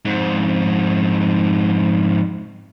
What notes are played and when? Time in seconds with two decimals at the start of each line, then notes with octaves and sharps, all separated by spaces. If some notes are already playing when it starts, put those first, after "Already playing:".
0.05 F2 G#2